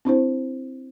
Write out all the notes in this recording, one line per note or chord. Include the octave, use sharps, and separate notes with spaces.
C4 D4 E4 C5